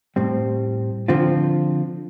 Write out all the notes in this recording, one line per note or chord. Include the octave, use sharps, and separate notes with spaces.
A2 G3 C4
D3 F3 C4 F4